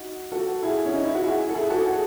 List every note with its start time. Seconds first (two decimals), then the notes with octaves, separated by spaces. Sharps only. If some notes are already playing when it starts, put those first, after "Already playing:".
Already playing: D#4 F#4
0.32 F#4 A4
0.63 E4 G#4
0.85 C#4
0.95 D#4
1.05 E4
1.15 F#4
1.24 E4 G#4
1.49 A4
1.55 E4 G#4
1.70 F#4 A4
1.91 G#4